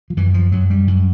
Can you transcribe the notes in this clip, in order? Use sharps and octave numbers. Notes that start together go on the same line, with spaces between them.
F3
F#2 E3
F3
F#2 F#3
G3
F#2